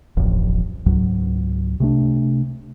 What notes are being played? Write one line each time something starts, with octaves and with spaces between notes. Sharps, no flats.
D1 A1 F2 F3
C#2 G#2 F#3
C3 A3 D4